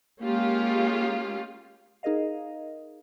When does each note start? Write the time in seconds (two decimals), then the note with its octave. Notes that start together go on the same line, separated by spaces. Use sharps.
0.23 G#3 A#3 C#4 F4 G4
2.03 D#4 G#4 A#4 D#5 F5